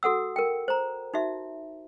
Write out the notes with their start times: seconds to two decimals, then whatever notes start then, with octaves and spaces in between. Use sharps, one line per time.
0.03 F#4 A4 F#5 E6
0.36 A#4 G5
0.68 C5 A#5
1.14 D#4 F#4 E5